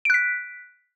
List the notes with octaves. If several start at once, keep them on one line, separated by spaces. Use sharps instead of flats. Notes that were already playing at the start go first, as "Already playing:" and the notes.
F#6 B6 D7